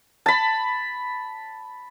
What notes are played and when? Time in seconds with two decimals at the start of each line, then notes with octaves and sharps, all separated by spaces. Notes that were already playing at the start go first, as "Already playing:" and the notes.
0.26 A5 B5